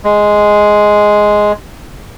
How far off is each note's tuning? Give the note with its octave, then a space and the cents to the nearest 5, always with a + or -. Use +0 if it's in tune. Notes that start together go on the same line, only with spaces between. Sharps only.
G#3 +5